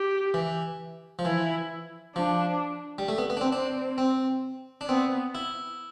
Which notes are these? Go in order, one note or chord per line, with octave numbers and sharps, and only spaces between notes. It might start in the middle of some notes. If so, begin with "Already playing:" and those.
Already playing: G4
E3
F3
E3 E4
F3 D4
G3
A3
B3
B3
D4
C4
C4 D4
C4
D4
B3 C4
E4